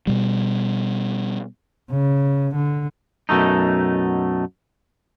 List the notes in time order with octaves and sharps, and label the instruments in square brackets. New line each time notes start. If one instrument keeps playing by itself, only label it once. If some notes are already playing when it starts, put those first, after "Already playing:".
[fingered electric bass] B2 G3
[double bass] C#3
D3
[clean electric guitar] F#2 B2 A3 D#4